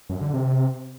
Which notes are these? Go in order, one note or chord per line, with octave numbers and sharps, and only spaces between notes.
F#2
D3
C3